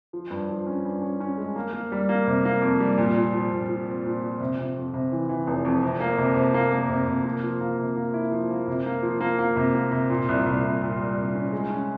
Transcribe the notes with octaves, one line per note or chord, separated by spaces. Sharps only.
F3
G2
F3
C#4
G2
C#4
C#4
G#3
A#3
A#3
G3
A#3
C3
A#3
F2
G3
A#2
A#2
F3
A#2
F3
C4
A#2
F3
C3
C3
F2
C3
E3
E3
F1
F2
C3
A#3
C3
C3
A#3
A#3
C3
C3
A#3
F3
A#3
C3
A#3
E4
F3
A#3
C3
A#3
F3
A#3
A#3
C3
A#3
C3
A#2
C2
C2
C2
A#2
G3
C2
C#4
G#3
C#4